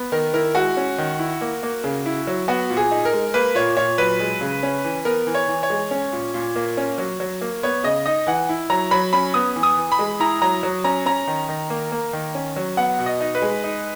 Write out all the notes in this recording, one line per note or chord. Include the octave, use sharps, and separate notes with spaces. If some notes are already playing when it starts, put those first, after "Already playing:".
Already playing: B3
D#3 A#4
E4 A#4
G#3 F#4
C#4
D#3
E4
A#3
A#3
C#3
E4
F#3
B3 F#4
A#2
G#4
D#4
A#4
G#3
A#3 B4
A#2 C#5
A#2 C#5
F#3 B4
G#3
C#3
C#4
E3
B3 A#4
E3
C#5
E3
C#5
G#3
C#4
A#2
A#2
A#3
C#4
F#3
F#3
A#3
B3 C#5
C#3 D#5
D#4 D#5
E3 F#5
E4
F#3 A#5
F#3 B5
C#4 B5
B3 D#6
E3
D#6
E3
B5
G#3
E4 A#5
F#3 A#5
F#3
C#4 A#5
C#4 A#5
D#3
D#3
A#3
A#3
D#3
C#4
F#3
B3 F#5
B2
D#5
D#4
B4
G#3
D#4